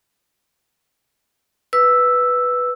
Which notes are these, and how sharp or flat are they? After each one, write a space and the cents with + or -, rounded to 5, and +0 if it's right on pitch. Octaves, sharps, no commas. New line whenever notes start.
B4 +0 E6 +0